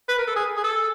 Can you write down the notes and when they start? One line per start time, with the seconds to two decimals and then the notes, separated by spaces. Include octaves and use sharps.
0.09 B4
0.19 A#4
0.27 A4
0.36 G#4
0.57 G#4
0.64 A4